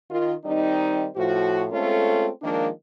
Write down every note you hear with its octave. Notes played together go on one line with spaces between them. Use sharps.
D#3 F4
D#3 G3 C4 D#4
A2 F3 F#4
G#3 A3 C4 C#4 F4 A4
D#3 F3 G#3 A#3 D4